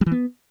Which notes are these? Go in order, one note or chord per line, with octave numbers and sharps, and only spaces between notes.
G3
E3
B3